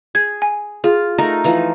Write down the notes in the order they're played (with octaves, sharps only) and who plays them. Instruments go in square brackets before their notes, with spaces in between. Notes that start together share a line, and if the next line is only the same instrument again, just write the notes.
[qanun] G#4 [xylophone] G#6
[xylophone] G#5
[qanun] F4 [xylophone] G#4
[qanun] A3 D#4 A#4
E3 F3 D#4